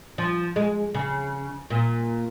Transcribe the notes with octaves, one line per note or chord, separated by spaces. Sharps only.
F3
G#3
C#3
A#2